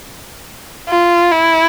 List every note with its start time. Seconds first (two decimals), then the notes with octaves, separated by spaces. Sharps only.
0.89 F4
1.31 E4